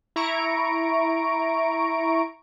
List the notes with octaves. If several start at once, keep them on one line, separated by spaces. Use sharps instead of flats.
E4 A#5 C#6 D7